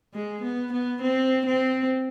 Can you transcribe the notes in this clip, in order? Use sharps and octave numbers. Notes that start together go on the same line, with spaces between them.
G#3
B3
B3
C4
C4